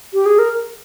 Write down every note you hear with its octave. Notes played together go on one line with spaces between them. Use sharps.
G4
G#4
A#4